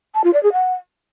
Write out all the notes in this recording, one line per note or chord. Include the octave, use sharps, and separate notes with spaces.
A5
F4
D5
G#4
F#5